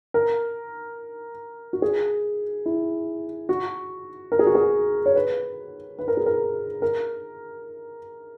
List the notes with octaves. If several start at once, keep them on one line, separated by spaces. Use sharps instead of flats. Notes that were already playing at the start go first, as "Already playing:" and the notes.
A#4
F#4
G#4
E4
F#4
A#4
G#4
F#4
G#4
C#5
B4
B4
A#4
G#4
A#4
A#4